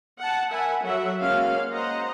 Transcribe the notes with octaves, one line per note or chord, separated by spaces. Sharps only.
F#5 A5
A#4 E5 F#5 G#5 B5
F#3 A4 E5 F#5
G#3 A#3 C#4 F#4 F5
C5 D#5 F#5 A#5